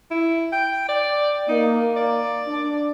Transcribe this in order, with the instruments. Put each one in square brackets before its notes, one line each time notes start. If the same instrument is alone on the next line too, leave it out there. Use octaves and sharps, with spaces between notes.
[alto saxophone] E4
G5
D5
[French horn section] A#3 [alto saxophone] D#4
[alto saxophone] D5
[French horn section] D4